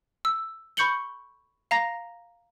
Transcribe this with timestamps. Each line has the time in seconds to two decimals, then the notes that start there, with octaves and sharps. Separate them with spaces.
0.25 E6
0.77 B5 C#6 G6 C#7 F#7 G7
1.71 F5 A#5 A#6